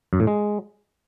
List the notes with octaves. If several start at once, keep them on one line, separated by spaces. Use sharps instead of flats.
F#2
A2
G#3